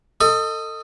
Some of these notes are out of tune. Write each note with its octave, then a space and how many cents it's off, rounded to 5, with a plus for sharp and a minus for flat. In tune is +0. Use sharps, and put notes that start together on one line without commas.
A4 +30 D#5 +0